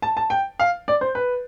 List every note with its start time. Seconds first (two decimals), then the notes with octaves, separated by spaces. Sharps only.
0.02 A5
0.17 A5
0.30 G5
0.59 F5
0.88 D5
1.01 C5
1.15 B4